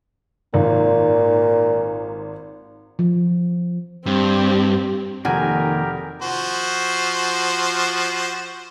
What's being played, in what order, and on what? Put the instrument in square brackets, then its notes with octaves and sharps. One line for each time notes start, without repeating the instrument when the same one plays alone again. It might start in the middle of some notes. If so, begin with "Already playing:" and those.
[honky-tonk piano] G#1 [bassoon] A#2
[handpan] F3
[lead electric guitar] G2 [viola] C4 G4
[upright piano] F1 [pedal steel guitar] D#3 A#3 G#5 [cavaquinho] F#4 [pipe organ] G4 A#4
[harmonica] F3 F#4 C5